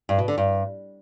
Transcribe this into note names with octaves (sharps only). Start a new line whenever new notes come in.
G2
B2
D3
G2